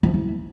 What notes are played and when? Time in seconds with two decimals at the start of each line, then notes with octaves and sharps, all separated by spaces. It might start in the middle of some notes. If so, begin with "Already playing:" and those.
0.03 F3
0.09 A3
0.14 E4